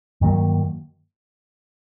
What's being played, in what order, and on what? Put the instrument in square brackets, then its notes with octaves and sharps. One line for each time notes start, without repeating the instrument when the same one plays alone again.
[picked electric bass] G2 D#3 F#3 A#3